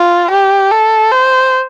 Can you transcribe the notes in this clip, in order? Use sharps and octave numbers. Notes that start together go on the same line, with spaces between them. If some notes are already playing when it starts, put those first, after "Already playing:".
Already playing: F4
G4
A4
C5